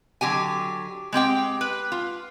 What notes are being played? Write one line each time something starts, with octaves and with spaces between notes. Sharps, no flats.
D3 F#3 G4 G#5
G#3 C4 G4 G5
B4
F4